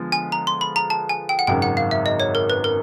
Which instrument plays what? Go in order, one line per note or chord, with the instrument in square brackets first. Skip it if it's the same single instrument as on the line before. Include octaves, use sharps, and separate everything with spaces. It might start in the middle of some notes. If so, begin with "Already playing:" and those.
Already playing: [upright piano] D3 F3 G#3 B3
[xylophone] G#5
A#5
C6
B5
A#5
A5
G#5
G5
F#5
[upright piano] G#1 F#2 C#3 [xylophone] G5
[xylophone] F#5
F5
E5
D#5
C#5
A#4
B4
A#4